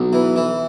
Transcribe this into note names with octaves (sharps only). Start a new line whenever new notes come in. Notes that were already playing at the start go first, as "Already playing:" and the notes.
Already playing: B1
E3
E3